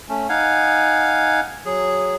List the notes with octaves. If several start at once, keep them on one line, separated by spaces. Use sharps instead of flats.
A3 C#4
D#4 F5 F#5 G#5
F#3 G#4